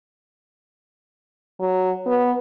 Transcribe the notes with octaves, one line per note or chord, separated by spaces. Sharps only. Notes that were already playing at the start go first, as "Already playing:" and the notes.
F#3
B3